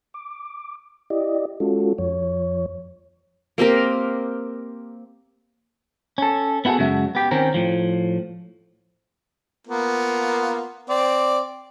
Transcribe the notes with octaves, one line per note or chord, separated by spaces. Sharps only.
D6
E4 G4 D5 D#5
G#3 C#4 F4 F#4 A4
F2 F3 C#5
A#3 C4 G4 A#4
C#4 A4
B3 E4 F#4 G#4 A4
F#2 C#3 G#3 F#4 E5
B3 G4
D#3 C4 C#4 A#4
A2 F3
A#3 B3 F4
C4 D5